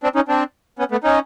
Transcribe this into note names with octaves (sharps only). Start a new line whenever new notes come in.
C4 D4
C#4 D#4
C4 D4
B3 C#4
A3 B3
C#4 D#4